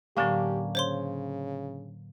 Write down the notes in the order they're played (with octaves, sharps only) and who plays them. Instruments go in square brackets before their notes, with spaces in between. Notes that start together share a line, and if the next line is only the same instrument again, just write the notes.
[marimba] A2 D3 F#3 [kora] A#3 C#4 D4 [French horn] G4
[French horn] C#3 [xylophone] C5 C#5 C6